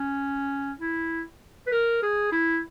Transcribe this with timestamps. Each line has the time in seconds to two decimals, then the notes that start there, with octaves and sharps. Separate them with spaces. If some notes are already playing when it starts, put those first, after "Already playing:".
Already playing: C#4
0.81 E4
1.67 B4
1.72 A#4
2.03 G#4
2.32 E4